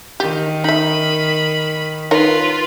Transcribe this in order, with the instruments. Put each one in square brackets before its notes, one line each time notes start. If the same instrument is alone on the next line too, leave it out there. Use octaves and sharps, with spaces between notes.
[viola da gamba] D#3 [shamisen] G4
[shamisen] D#4 E5 [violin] B5
[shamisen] D#4 A#4 C#5 [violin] F4 B4